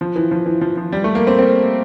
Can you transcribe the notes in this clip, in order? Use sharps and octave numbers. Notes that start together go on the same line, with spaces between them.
F3
E3
F3
E3
F3
F3
G3
A3
A#3
C4
C4